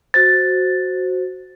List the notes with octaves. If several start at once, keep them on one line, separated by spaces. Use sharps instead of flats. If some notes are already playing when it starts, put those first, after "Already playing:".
F#4 C5 A6